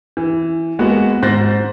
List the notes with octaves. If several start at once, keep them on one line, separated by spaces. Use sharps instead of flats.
E3
G#3 A#3 B3 F#4
G#2 C5 F#6 A6 A#6